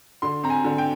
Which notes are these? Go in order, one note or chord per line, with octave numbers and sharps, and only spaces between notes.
D3 C6
C4 A#5
G#5
D3
G5